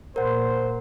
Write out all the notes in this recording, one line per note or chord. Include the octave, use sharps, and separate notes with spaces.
A#2 A#4 C5 F#5